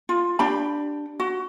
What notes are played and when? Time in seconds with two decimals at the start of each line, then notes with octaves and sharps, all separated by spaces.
0.09 F4
0.39 D4 G4 B5
1.20 F#4